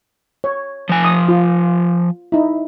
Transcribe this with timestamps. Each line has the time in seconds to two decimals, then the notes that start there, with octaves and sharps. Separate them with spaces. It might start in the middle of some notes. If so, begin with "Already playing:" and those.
0.44 C#5
0.89 F3 G#5
1.05 D#6
1.29 F4
2.32 D#4 E4